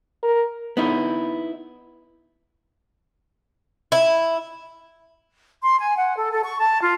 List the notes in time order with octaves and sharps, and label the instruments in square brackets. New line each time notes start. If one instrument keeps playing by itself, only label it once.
[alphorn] A#4
[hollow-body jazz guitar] B3 D#4 E4
[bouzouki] E4
[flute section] C6
G#5
F#5
A4
A4
C#6
A5
F4